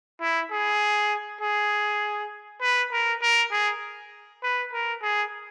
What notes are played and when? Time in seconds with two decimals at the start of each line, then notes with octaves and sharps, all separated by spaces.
0.21 E4
0.51 G#4
1.41 G#4
2.62 B4
2.92 A#4
3.22 A#4
3.51 G#4
4.43 B4
4.73 A#4
5.02 G#4